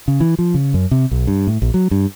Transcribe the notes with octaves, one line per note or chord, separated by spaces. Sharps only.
C#3
E3
F3
C#3
F#2
C3
B1
G2
A2
A#1
F#3
G2